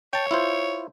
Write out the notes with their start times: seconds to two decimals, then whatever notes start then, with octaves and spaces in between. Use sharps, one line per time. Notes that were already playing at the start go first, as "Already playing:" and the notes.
0.13 C#5 G5 A5
0.31 E4 F4 C5